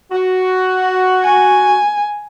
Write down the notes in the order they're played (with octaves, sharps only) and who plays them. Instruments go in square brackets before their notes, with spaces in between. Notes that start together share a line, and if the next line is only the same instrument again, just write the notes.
[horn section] F#4
[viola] G#5